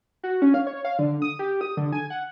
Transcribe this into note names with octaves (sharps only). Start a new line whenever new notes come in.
F#4
C#4
F5
C#5
F5
D3
D#6
G4
D#6
D3
G#5
F#5